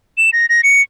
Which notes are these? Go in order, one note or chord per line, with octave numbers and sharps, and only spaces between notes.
E7
A#6
A#6
C#7